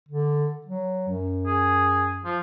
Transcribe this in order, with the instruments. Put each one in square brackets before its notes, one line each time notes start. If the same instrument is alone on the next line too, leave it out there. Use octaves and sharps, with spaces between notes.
[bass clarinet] D3
F#3
F#2
[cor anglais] G#4
F3